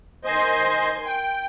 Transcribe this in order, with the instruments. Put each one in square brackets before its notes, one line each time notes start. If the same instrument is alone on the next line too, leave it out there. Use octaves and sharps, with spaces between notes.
[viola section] D#3 G#5 C6 [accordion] C5 D#5
[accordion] G5